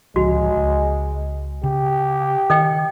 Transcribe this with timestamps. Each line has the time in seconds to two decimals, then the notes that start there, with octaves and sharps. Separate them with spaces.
0.16 D1 C#2 F3 G#3 F#4
0.56 C#2
1.63 C#3 G4
2.50 D#3 A4 D#5 G5